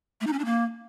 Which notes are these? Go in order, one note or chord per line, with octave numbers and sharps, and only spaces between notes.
A3
D#4
C#4
D4
A#3